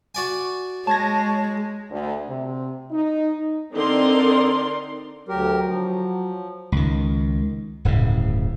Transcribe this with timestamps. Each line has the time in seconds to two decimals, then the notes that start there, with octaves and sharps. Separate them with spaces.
0.15 F#4 D5 G#5
0.87 G#3 C#5 A5 G#6 A#6
1.90 D2
2.28 C3
2.91 D#4
3.73 D3 C4 D#4 A#4 D5 C6
5.29 D2 F#3 G4 A#4
5.65 F3
6.72 C#2 D#3
7.85 D1 G1 A2 C#3